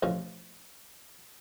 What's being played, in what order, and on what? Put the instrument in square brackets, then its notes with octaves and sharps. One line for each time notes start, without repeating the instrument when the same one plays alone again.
[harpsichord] A1 B2 F3 C#4